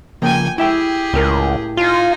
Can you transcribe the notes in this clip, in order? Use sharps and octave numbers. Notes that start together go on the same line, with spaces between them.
C#3 F3 A#3 G5 G#5
E4 G4 G#4 E5 G5
C#2 A2 A#4
D#4 F4 G#5